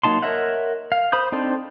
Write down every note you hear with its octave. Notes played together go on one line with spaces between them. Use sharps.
F#3 A#3 D#4 A5 C6
A#4 C#5 D#5 E5 F#5
F5
C5 B5 D#6 G6
C4 D4 D#4 A4 C5